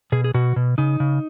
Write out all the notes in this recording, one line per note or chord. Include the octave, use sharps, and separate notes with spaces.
B2 G#4
G#4
B2 F#4
B2
C#3 D#4
C#3